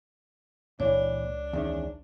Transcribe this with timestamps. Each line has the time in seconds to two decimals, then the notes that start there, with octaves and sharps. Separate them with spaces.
0.80 C#2 A#2 E3 D4 C#5
1.53 E2 D#3 C#4